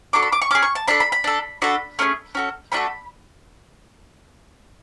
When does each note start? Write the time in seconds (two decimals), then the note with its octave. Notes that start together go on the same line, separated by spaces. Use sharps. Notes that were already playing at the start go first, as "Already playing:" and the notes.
0.13 D4 F#4 A4 D6
0.22 B5
0.32 D6
0.42 C#6
0.51 C#4 G#4 D6
0.62 C#6
0.75 A5
0.88 D4 A4 B5
1.00 B5
1.12 B5
1.24 D4 A4
1.62 D4 F#4 A4 B5
1.99 A3 C#4 E4 G#4
2.35 C#4 F#4 A4
2.72 A3 D4 F#4 A4 B5